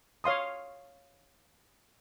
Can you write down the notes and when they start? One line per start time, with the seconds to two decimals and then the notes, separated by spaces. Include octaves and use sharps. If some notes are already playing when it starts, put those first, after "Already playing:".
0.24 C#5 F5 C6 D#6